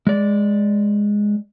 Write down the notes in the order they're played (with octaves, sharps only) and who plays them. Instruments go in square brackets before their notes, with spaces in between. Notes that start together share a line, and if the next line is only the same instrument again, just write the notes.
[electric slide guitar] G#3 D5